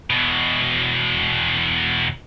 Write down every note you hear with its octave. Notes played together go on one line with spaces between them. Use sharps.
E2 B2